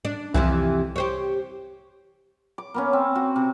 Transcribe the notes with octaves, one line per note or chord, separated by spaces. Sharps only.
D4
C2 F2 C3 E3
G4 C5 C#5
D6
A#3 B3 C#4
C4
F#4
C3